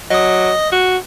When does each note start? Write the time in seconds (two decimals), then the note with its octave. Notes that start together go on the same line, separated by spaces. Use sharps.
0.10 F#3 D#5 D#6
0.72 F#4